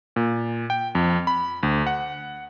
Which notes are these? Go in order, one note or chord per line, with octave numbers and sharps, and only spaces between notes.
A#2
G5
F2
B5
D2
F#5